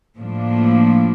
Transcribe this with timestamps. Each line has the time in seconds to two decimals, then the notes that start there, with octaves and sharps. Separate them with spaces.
0.17 A2 F3 A#3 D4